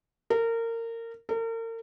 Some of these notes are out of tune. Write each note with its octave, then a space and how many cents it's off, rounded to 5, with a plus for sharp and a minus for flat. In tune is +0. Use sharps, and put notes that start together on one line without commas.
A#4 -25
A#4 -40